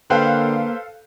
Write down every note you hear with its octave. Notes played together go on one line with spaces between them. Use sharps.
D3 A#3 A4 B4 C5 F5 G5 F#6